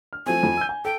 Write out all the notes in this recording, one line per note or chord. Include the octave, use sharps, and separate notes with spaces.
F6
F3 A3 C4 G#5
F2 F3 C5
E6 G6
G#5
A4 G5